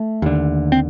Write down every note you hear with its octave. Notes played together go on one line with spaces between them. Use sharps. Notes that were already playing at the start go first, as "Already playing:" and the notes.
Already playing: A3
D#2 D3
C4